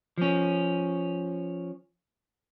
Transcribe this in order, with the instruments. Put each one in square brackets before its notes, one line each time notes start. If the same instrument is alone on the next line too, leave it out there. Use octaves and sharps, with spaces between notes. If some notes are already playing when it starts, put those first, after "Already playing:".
[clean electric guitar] F3 C#4